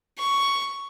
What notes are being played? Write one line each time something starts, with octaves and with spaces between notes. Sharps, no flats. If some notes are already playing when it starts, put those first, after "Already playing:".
C#6